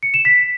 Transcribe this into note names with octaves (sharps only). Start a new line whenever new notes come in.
C#7
E7
B6